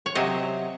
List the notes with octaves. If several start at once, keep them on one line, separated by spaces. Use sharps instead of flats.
C#5
C3 F#3 C5 D#5